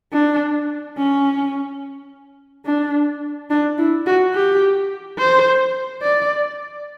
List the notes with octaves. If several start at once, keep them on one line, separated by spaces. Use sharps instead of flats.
D4
C#4
D4
D4
E4
F#4
G4
C5
D5